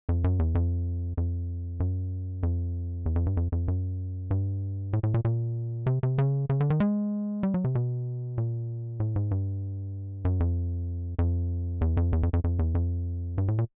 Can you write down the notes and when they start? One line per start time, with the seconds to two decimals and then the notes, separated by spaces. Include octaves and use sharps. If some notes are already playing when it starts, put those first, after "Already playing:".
0.09 F2
0.24 F#2
0.39 E2
0.55 F2
1.17 F2
1.80 F#2
2.43 F2
3.06 E2
3.16 F2
3.26 G2
3.37 F2
3.52 F2
3.68 F#2
4.31 G2
4.93 A2
5.03 A2
5.14 A#2
5.25 A#2
5.86 C3
6.03 C3
6.18 C#3
6.50 C#3
6.60 D3
6.70 D#3
6.80 G#3
7.43 G3
7.54 F#3
7.64 C3
7.75 B2
8.38 A#2
9.00 A2
9.16 G#2
9.31 G2
10.25 F#2
10.40 F2
11.19 F2
11.81 E2
11.97 F2
12.13 E2
12.23 F2
12.33 F2
12.44 F2
12.59 E2
12.75 F2
13.38 G2
13.48 A2
13.58 A#2